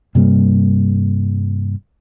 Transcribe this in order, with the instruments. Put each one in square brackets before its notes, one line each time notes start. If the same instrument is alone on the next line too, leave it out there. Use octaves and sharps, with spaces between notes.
[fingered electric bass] G2 C3 G3 A#3